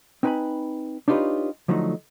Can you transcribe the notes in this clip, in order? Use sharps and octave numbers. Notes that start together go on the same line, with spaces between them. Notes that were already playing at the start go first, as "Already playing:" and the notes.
C4 D#4 B4 G5 G#5 B5
D4 D#4 F4 G4 B4 C#5
D3 F3 F#3 A3 D#4